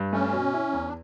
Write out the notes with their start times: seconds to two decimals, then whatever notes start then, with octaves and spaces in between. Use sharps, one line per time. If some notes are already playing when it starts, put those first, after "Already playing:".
Already playing: G2
0.13 A3 C#4
0.33 B2
0.54 E4
0.73 E2
0.87 D4